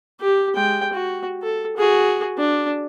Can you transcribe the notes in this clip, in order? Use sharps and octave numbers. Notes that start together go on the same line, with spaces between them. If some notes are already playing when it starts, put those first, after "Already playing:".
G4
G#3 G5
F#4
A4
F#4 G#4
D4